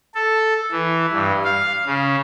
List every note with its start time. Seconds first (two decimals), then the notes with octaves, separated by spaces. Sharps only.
0.15 A4
0.72 E3
1.12 G2
1.44 F5
1.86 C#3